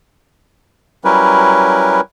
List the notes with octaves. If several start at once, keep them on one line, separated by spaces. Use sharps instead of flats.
F#3 G3 C#4 E4 A#4 B4